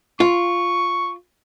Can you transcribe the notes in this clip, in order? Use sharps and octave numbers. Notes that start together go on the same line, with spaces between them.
F4 C#6